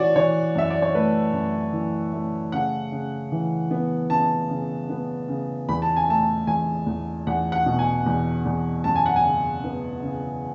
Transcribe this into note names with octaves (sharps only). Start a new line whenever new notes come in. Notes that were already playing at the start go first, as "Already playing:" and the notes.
Already playing: E3 F#4 C#5 D5
E3 C#5
F#2 E5
D5
C#5
A3 B4
F#2
E3
A3
C#3 F#5
C#3
E3
B3
C#3 A5
C#3
B3
C#3
E2 B5
A5
G#5
A3 A5
E2 G#5
E2
E2 F#5
F#5
B2
G#5
E2
E2
F#2 A5
G#5
F#5
G#5
C#3
B3
C#3